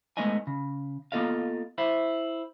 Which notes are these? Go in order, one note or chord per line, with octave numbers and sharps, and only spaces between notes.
G#3 A3 B3 D#4 D#5 G#5
C#3
A#3 B3 F4 A4 D#5 F5
E4 C5 E5